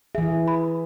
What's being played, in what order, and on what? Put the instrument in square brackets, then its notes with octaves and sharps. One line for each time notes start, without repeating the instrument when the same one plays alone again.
[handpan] E3 G#4 [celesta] E5
[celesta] B5